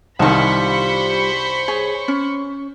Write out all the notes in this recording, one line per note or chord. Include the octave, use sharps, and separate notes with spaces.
C2 D#3 G3 F4 C5 A5 B5 C#6
G#4 C#5
C#4